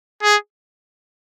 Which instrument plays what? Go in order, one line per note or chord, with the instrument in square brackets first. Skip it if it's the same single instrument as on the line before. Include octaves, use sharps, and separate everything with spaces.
[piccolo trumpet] G#4